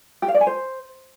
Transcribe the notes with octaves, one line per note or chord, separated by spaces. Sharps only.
G4
F5
D5
G#5
C5